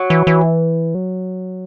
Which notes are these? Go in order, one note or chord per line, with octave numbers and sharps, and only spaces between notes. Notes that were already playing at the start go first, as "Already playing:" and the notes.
Already playing: F#3
E3
E3
F#3